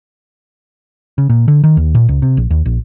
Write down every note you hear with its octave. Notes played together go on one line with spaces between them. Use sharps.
C#3
A#2
D3
D#3
D#2
A#2
C#2
C3
A#1
D#2
A#1